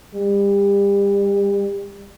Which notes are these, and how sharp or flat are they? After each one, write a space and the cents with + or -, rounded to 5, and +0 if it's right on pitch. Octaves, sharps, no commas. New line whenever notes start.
G3 +30